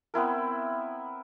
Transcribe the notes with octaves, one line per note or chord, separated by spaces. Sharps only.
B3 C4 E4 A#4